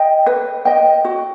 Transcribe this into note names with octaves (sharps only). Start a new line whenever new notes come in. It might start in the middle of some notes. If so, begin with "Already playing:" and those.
Already playing: D#5 G5
B4
D#5 G5
F#4